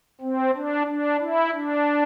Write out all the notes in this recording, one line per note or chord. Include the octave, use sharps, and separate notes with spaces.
C4
D4
D4
E4
D4